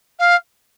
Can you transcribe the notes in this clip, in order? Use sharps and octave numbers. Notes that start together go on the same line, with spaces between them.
F5